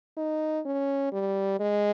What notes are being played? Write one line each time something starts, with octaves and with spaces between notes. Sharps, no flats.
D#4
C#4
G3
G#3